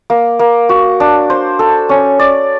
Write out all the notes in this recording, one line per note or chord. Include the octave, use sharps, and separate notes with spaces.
A#3
A#3
F#4
D4
C5
A4
C#4
D5